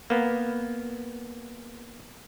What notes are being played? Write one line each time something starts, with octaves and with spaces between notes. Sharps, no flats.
A#3 B3